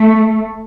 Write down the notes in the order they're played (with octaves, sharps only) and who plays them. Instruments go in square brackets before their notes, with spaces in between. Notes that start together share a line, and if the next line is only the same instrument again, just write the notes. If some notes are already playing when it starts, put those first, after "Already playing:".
Already playing: [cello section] A3